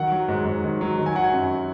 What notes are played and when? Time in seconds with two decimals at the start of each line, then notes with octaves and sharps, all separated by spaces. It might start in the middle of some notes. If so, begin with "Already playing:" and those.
Already playing: D#3 F#3 F#5
0.12 F#3
0.29 G#2
0.45 G#2
0.64 D#3
0.81 F#3
0.98 D#3
1.06 G#5
1.15 F#3 F#5
1.24 G#5
1.33 F#2